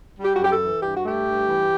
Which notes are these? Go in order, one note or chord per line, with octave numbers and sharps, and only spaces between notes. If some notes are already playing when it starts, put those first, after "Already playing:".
G3
G4
F#2 F#4
G4
A4
E3
G2 G4
F#4
A3 G4
G2
E3